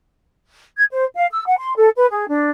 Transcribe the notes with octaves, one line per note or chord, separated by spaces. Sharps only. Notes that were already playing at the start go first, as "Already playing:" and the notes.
G#6
C5
F5
E6
F#5
C6
A4
B4
G#4
D4